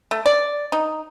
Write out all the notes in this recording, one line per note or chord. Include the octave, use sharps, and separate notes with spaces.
A3
D5
D#4